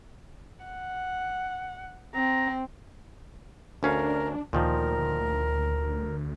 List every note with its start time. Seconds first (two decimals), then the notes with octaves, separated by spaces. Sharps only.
0.65 F#5
2.14 C4 A#5
3.83 D2 C#4 D4 A#4 F5
4.53 D2 A#2 D#3 F3 A#4